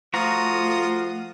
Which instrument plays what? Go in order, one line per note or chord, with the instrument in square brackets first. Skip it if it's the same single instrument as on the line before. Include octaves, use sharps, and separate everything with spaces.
[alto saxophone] F3 [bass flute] A3 [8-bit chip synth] F4 D#6 [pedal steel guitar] F#4 A#5